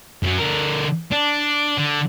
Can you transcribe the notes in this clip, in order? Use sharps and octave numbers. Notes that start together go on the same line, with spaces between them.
F#2 F#3
D3 A#4
D4
D3